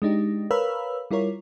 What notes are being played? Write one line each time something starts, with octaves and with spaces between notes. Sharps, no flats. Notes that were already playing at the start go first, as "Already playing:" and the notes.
G#3 D4 D#4 G4
A#4 B4 C#5 F5 B5 E6
G3 E4 F4 A#4 C#5